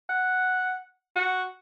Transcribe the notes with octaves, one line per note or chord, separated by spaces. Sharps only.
F#5
F#4